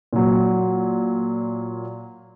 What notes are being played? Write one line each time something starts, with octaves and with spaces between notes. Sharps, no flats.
A#2 F#3